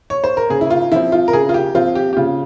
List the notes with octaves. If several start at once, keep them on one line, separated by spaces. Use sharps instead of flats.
C#5
C5
A#4
C#3 G#4
E4
F4
F3 C4 E4
F4
A#4
C#3 G#4
F4
G4
F3 C4 F4
G4
G4
C#3 F4